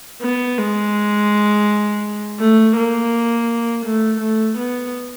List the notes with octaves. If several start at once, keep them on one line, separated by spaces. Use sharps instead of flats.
B3
G#3
A3
A#3
A3
A3
B3